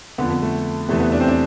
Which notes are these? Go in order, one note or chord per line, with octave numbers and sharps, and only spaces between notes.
F2 D3 B3
B3
A3
E2 C3 E3 A3
B3
D4
C4
D4